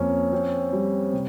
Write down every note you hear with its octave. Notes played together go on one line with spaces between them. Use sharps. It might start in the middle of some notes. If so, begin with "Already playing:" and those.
Already playing: F2 A#3 C#4
C4
G3
C3